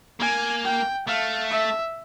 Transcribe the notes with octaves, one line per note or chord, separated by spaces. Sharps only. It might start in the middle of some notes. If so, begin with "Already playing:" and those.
A#3 G#5
G5
A3 F5
E5